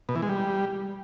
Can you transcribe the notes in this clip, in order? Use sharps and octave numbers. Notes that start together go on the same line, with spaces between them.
B2
E3
G#3
G3